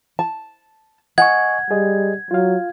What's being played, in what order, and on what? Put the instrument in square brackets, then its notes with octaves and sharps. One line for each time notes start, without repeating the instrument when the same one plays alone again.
[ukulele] A5
[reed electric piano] D#5 G#5 C#6 [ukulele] F#5 [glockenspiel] G#6
[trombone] G3 [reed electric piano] G#4 D#5
[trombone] F#3 [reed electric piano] F4 F5